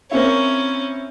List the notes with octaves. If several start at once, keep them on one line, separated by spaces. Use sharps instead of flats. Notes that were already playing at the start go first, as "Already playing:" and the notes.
A#3 C4 C#4 E4